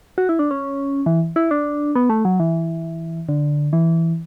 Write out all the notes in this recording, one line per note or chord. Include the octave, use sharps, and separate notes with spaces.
F#4
E4
D4
C#4
E3
E4
D4
B3
A3
F#3
E3
D3
E3